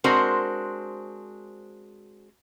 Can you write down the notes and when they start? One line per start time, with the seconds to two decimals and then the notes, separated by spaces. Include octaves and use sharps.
0.04 G#3 C4 D4 F#4 A#4 C5